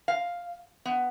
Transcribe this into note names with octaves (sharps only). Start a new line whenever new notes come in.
F5
B3